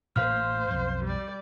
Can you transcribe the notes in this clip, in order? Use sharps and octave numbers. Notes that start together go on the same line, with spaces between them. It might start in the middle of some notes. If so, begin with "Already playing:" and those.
A1 A2 A#3 C5 F5 F6
B1 F2
G3 D5